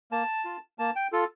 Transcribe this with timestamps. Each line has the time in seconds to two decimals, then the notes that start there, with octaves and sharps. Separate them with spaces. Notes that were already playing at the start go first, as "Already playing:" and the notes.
0.12 A#3 A5
0.45 F4
0.79 A#3 A5
0.96 G5
1.13 F4 A4